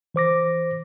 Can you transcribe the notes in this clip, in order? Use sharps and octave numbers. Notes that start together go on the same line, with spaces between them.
E3 C5 D6 A#6